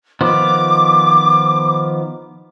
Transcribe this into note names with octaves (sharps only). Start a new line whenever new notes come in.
D#3 F3 B3 D6